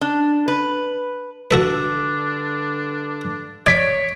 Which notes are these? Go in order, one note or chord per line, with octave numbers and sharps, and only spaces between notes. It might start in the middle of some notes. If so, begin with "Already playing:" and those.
D4
B4
G2 D3 D4 F#4 A4 B4
C#5 D5 G#6 B6 D7